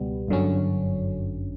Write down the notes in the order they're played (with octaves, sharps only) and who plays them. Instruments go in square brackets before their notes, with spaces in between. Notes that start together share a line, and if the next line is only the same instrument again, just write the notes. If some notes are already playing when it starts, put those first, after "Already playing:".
Already playing: [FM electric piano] C#2 B2 G3 B3
G1 F#2 D3 F#3 C#4